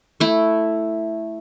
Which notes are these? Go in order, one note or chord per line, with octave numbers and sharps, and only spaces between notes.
A3 E4